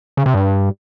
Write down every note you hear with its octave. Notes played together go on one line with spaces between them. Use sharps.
C#3
C3
G2